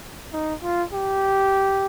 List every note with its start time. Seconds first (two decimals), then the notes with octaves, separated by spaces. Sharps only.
0.33 D#4
0.63 F4
0.93 G4